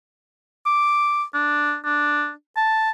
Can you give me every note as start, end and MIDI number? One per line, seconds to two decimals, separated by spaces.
0.66 1.24 86
1.34 1.76 62
1.85 2.31 62
2.57 2.91 81